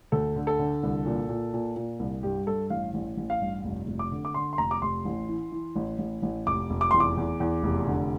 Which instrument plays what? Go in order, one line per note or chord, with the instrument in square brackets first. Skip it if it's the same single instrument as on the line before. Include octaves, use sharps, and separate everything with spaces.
[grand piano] D2 A4
D3
A4
D3
C2
A#2
A#2
A#2
A#2
C2
G2 G4
G2 A4
A1 F5
A1
A1
F5
G2
F1
F1
D6
D3
D6
D3 C6
C6
F1 A#5
D6
F1 C6
A1
E3
E3
A1
A1
A1
F1 D6
F1
D6
E2 C6
D6
E2
E2
F1
D3